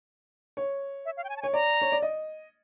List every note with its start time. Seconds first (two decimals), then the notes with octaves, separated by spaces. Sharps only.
0.57 C#5
1.05 E5
1.17 F5
1.24 G5
1.29 G#5
1.37 A5
1.42 C#5 G#5
1.53 D5 A#5
1.81 C#5
1.92 D5
2.02 D#5